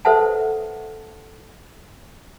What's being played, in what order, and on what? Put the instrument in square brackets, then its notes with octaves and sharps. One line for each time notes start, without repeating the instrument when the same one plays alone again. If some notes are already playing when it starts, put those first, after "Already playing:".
[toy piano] A4 B4 C5 E5 F#5 A5